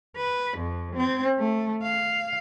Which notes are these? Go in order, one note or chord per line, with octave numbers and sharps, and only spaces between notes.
B4
F2
C4
A3
F5